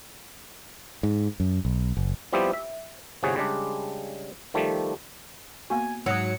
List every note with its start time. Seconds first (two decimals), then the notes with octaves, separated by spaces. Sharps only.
1.03 G#2
1.40 F#2
1.65 B1
1.97 F#1
2.33 F3 G3 B3 C4 E4 G4
2.53 E5
3.23 G1 C2 C3 F#4 G#4 C#5
3.36 C#3 G3 G#3 D4
4.54 D#3 F3 G3 A3
5.70 A#3 B3 F#4 G#5
6.06 G#2 F#3 D#6 E6 C#7